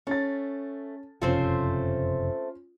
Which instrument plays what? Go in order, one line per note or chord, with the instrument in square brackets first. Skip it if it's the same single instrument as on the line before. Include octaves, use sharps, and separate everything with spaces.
[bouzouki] A3 [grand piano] C#4 A6
[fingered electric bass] F#1 F2 C3 [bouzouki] A3 C4 C5 [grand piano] C#4 F4